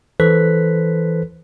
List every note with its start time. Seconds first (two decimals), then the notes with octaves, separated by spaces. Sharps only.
0.20 E3 A4 B4 C5 F#6 B6